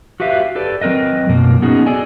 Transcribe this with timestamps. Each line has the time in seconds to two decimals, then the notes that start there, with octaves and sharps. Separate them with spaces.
0.20 F#4 G4 B4 E5 F5
0.55 G4 A4 B4 D5
0.81 F#3 C4 A#4 B4 D#5
1.29 F#2 B2 A#3
1.62 B3 C#4 D#4 F#4 G#4
1.86 G#4 A4 D5 D#5 G#5